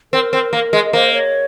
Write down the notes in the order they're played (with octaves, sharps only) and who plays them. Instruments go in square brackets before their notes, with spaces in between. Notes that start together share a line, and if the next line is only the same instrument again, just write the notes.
[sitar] C4 [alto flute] A#4
[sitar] C4
A#3
G#3
[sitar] A#3 [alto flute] C5
[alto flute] C#5